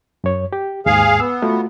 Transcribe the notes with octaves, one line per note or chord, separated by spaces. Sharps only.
F#2 C#5
G4
D#2 G#2 G#4 F5
B3 E6
A3 F4 F#4